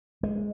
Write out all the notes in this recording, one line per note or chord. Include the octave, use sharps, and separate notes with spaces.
G#3